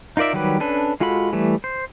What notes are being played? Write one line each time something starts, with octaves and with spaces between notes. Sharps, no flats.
D#4 F4 A#4 D5 E5
D#3 F#3 G3 G4 B4
C#4 D4 A4 B4
G#3 F4 F#4 A4 B5
E3 G3 A3
C5